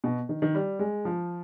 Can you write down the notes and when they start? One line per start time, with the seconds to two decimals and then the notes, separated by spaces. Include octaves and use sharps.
0.04 B2
0.29 D#3
0.42 D#3
0.55 G3
0.79 G#3
1.05 F3